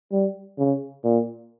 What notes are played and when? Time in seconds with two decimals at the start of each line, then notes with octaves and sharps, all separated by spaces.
0.12 G3
0.59 C#3
1.04 A#2